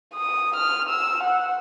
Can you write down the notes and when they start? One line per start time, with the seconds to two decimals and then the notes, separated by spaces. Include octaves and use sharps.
0.15 D#6
0.56 F6
0.89 E6
1.23 F#5